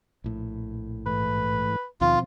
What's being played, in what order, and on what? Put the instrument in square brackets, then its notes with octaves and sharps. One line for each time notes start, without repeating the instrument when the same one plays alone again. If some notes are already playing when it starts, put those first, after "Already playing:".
[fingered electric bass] A#1 A2
[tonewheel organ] G#2 E3 A3 [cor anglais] B4
[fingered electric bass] D#2 D#3 [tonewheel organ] B2 F3 C4 [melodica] F4